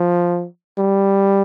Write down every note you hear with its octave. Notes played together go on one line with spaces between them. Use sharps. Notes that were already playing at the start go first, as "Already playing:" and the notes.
Already playing: F3
G3